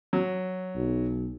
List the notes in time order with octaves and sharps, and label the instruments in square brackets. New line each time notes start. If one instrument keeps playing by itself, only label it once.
[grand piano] F#3
[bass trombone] B1